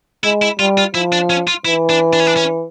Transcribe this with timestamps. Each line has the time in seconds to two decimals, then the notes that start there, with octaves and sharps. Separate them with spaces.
0.24 G#3 E4
0.42 E4
0.59 G3 F4
0.78 F4
0.95 F3 E4
1.12 D4
1.30 C#4
1.48 F4
1.65 E3 E4
1.90 D4
2.13 D4
2.20 C#4
2.27 D4
2.37 C#4